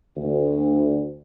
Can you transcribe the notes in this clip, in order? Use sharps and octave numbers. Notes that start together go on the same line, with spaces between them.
D2